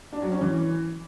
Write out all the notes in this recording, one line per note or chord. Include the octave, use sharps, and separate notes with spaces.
D4
F#3
C#4
E3